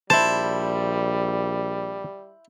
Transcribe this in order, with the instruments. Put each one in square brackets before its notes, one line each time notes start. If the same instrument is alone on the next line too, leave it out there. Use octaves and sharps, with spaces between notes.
[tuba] A#1 [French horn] G3 [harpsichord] E4 C5 [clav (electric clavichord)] A5